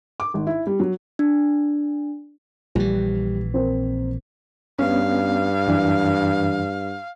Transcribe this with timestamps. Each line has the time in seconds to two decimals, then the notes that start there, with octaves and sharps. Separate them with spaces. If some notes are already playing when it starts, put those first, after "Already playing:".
0.20 D6
0.34 G#1
0.47 E4
0.67 G3
0.80 F#3
1.19 D4
2.75 A#1 E3 G3
3.54 C4 A#4 C5
4.79 G2 B3 C#4 F5
5.67 F#2 E3 D4